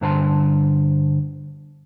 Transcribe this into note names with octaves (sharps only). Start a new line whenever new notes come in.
G2 D3 C5 A5 A#5 C6